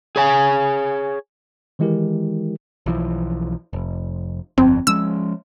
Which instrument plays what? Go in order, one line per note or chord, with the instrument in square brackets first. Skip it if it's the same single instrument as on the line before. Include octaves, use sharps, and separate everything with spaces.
[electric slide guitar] G#4 C#5 G#5
[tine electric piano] D#3 E3 G#3 E4 G4 A#4
[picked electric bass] B1 E3 F3
F1
[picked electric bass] G1 F2 [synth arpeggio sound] C4
[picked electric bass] F3 G#3 C#4 [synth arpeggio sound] E6